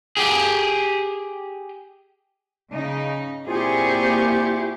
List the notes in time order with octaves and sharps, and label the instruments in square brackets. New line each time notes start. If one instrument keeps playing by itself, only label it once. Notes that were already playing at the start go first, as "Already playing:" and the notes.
[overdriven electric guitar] G4 G#4
[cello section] C#3 D#4
[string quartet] A#2 C4 C#6 [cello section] A#3 G#4 [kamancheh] E4 G4 [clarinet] F4